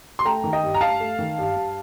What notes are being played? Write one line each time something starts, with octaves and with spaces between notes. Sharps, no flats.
C6
A3 G5 A#5
D#3
D#5 G5
G2
A#5
G2 F5 A5
A3
D#3
G2
G2